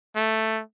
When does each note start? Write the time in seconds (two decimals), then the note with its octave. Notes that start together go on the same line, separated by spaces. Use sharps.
0.16 A3